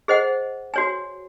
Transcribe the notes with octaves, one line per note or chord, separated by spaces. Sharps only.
G#4 C5 D#5 F#5
F#4 C#5 G#5